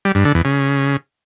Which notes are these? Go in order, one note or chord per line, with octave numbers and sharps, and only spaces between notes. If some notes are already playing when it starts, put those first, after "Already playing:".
G3
G2
D3
E2
C#3